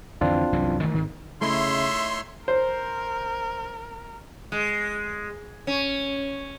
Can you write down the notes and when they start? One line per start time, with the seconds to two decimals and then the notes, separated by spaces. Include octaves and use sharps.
0.21 F2 D3 E3 C4 D4 F4
0.53 C2 F#2 E3
0.82 D#3 E3 A3
0.94 G#1 D#3
1.41 C#3 A3 D#4 E4 C#5 D#5 E5 C6
2.48 A#4 C5
4.52 G#3
5.67 C#4